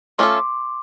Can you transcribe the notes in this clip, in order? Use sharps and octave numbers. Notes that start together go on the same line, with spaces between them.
A3 C#4 F4 A4 C6 D6